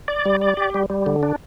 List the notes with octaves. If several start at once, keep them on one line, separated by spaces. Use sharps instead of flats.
D5
G3
D5
G4
G3
G3
D3
D4